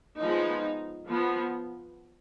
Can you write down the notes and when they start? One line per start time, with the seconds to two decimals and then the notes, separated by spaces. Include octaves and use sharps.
0.19 F3 G#3 B3 D#4
1.06 F3 B3